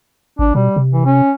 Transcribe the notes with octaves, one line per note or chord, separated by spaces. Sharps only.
G#1 D4
B2 G3
C3
E3
C#4